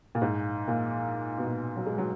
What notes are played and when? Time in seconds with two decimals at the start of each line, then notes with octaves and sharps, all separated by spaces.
0.15 A#2
0.22 G#2
0.68 A#2
1.38 B2
1.46 A#2
1.77 F#3
1.87 G#3
1.98 F#3